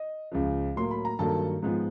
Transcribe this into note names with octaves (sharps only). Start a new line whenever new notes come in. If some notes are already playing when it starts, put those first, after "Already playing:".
Already playing: D#5
C#2 C#3 F3
A2 F#3 A#3 C6
B5
A#5
G2 D#3 F#3 A#3 A4 A5
G#2 F3 G#3 B3